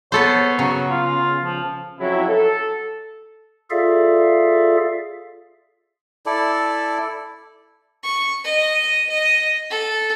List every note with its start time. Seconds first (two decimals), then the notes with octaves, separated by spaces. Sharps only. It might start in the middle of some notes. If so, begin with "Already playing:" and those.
0.12 B3 A4 C5 C#5
0.59 C#3 F#3
0.90 F4
1.43 F3
1.99 F2 C#3 F#3 E4
2.29 A4
3.70 F4 G#4 A4 D5 E5 F5
6.26 E4 A4 D5
8.03 C#6
8.44 D#5
9.09 D#5
9.70 A4